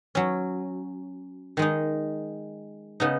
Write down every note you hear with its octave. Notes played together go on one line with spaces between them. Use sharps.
F#3 C#4
D#3 G#3 D#4
C#3 B3 D#4